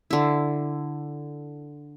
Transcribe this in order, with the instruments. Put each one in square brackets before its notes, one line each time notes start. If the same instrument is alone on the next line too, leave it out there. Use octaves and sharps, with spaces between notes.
[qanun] D3 E4